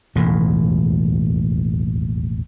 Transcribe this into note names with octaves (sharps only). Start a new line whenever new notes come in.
E1 A1 D#2 A2